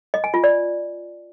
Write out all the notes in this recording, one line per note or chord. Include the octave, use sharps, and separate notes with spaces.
D#5
G#5
F4
D5